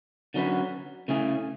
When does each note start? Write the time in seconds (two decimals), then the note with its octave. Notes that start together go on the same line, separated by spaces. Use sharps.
0.34 D3 F#3 C#4 F#4 B4
1.08 C#3 E3 A3 C#4 G#4